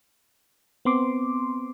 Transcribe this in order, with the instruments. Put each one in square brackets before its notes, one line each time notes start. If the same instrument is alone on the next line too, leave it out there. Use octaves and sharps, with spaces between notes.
[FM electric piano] B3 C4 C6 D6